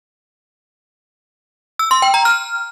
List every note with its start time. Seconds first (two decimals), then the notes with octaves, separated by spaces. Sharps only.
1.79 E6
1.91 C6
2.02 G5
2.14 A#5
2.25 F6